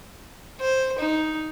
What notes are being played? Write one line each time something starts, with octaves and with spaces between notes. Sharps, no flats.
C5
D#4